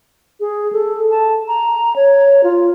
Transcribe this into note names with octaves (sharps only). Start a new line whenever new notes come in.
G#4
A4
A5
A#5
C#5
F4